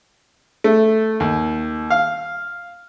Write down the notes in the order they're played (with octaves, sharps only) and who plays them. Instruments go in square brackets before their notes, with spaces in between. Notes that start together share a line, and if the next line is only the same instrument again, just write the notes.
[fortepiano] A3
D#2
F5